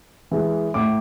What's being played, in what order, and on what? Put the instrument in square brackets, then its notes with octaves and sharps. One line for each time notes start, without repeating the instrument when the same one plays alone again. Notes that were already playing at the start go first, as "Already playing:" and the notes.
[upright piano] E3 G#3
A2 D6